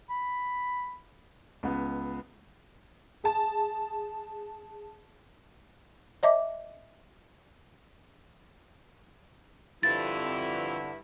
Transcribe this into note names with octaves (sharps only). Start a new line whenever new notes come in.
B5
C#2 B3
G#4 A5
C#5 D#5 E5 D6
G2 D3 C4 E4 F4 A6